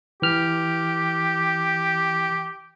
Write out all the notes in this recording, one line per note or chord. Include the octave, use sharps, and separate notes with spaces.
E3 G4 F6